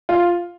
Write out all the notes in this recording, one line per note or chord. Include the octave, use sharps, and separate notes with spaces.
F4